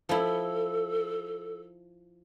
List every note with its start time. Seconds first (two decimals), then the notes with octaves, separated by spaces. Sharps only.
0.09 F3 E4 A4